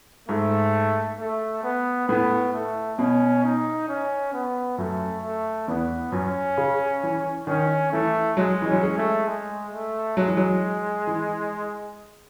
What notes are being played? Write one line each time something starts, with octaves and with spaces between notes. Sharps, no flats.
G#2 A3
A3
B3
A2 B3
A3
B2 C#4
D#4
C#4
B3
F#2 A3
A3
E2 B3
F#2 C#4
C#3
E3
D#3 C#4
E3 A3
F#3 G#3
E3
F#3 C#4
G#3
A3
G#3
A3
F#3 G#3
E3
F#3
E3